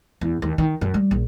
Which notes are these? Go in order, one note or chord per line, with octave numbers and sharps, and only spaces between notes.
E2
D#2
D#3
F#2
G3
A#1